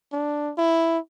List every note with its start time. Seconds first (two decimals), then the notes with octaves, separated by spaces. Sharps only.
0.12 D4
0.58 E4